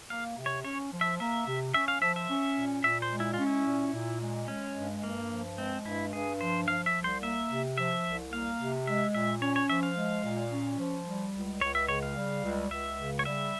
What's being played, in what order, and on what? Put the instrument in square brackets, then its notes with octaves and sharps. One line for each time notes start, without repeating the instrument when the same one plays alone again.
[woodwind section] A#3 [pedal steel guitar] F5
[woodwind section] C3
[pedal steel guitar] C#5
[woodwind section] C#4 [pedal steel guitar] C#5
[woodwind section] F3
[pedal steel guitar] E5
[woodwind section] A#3 [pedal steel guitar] E5
[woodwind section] C3
[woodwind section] C#4 [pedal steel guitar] E5
[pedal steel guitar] F5
[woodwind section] F3 [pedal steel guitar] E5
[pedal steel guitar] E5
[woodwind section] C#4
A#2
[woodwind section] A#2 [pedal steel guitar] E5
[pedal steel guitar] C5
[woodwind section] G#3
[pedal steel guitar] E4
F4
[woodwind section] C#4
[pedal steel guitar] E4
[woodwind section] A#2
A#2
G#3
[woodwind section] G#3 [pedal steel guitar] C#4
[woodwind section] G2
[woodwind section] G2 [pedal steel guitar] A#3
[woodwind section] F3
[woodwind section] G#3 [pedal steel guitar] C4
[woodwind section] G2 [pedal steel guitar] E4
[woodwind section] G2 [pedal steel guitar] G#4
[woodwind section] F3 [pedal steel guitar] C5
[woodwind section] F3 [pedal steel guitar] F5
[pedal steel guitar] E5
[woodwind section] C2
[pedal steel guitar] C5
[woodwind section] A#3 [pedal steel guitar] E5
[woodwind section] C3
[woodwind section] F3 [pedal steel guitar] E5
[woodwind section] C2
[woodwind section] A#3 [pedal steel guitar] F5
[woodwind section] C3
[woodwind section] G#3 [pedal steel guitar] E5
[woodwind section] A#2 [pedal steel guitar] E5
[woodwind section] C#4 [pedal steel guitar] C#5
[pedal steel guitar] C#5
[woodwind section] F3 [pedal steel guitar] E5
[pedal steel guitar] F5
[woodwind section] G#3
A#2
C#4
F3
G3
C#2
[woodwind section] C#2 [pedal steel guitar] C#5
[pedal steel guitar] E5
[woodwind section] C#3 [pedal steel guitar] C#5
[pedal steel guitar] F5
[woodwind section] G3
C#2
[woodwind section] C#2 [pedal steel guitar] E5
[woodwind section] C#3
[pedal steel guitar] C#5
[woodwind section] G3 [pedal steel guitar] E5